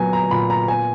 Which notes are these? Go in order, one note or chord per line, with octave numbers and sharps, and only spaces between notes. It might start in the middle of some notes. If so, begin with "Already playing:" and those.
Already playing: A#2 F#3 B3 G#5
A#5
A#2 B5
A#5
B3 G#5